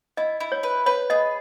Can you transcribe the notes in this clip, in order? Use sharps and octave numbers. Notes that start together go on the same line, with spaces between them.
E4 D#5
E4
C#5
B4
B4 C#5
G#4 D#5